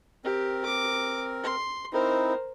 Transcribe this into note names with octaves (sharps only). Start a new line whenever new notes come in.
C4 G4 A#4
D6
C6
C4 D#4 E4 A#4 C5